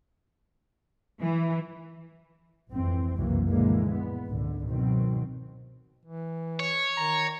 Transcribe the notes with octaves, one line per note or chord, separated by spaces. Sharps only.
E3
G#1 F2 E3 C4
F#1 C2 F2 E3 F#3 A#3
A#2 D3 E3 F3 G#3 A#3
B3
G#1 C#2 A#2 D3
B2 D#3 F#3 C4
E3
C#5
D#3 A#5